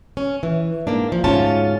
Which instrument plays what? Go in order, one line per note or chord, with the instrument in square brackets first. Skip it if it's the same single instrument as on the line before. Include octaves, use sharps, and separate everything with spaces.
[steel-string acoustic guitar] C#4
E3
G#2 A#3 D4
F3
D2 G#2 C#4 F4 A5